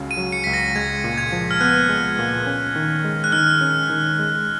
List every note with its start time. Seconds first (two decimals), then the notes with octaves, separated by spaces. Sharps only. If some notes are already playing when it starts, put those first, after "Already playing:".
Already playing: C#2 C#3 F#3 C#4
0.11 D#7
0.17 F#3
0.32 C#7
0.44 C#2 B6
0.53 A#6
0.75 G#3 G#6
1.04 A#2
1.18 G#6
1.32 F3
1.51 F6
1.61 B3 F#6
1.89 G#3
2.19 A#2
2.46 C#4
2.76 D#3
3.04 G#3
3.24 F#6
3.32 D#3 F6
3.61 C#4
3.90 D#3
4.19 G#3